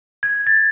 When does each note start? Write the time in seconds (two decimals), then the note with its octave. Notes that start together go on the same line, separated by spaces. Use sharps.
0.23 G#6
0.47 A6